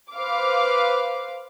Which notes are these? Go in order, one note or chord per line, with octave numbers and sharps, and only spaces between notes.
B4 C5 F5 D6